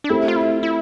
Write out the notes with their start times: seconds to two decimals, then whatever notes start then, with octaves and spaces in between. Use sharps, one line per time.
0.04 D4
0.09 A3 C4 E4 G4
0.28 F4
0.36 E4
0.63 E4